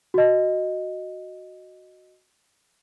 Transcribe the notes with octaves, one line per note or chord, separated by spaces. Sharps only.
F#4 D#5